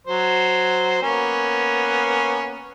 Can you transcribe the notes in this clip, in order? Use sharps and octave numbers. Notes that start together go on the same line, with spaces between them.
F#3 C5
A#3 B3 C#4